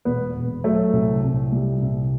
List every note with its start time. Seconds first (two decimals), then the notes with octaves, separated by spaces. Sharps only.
0.05 E1 B3
0.36 E1
0.64 F#3 A3
0.93 C2
1.24 C2
1.52 G3
1.82 C2